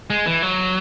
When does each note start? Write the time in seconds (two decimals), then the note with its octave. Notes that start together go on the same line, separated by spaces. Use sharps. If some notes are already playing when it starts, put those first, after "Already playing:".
0.10 G#3
0.26 E3
0.43 F#3